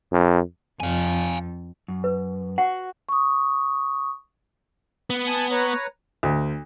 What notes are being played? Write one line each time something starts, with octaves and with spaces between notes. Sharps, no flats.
F2
F2 F5 G#5
F#2
B4
F#4 F#5
C#6 D#6
B3
G#5 A5 D#6
B4 C#5 A#5
D2